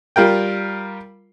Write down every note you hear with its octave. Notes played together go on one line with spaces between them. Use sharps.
G3 F4 A#4 G5